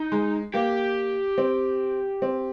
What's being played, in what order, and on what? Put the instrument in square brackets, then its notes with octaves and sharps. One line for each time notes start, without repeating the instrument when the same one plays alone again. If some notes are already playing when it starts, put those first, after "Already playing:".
Already playing: [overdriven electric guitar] D#4
[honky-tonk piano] G#3
[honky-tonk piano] A#3 [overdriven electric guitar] G4
[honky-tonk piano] C4
C4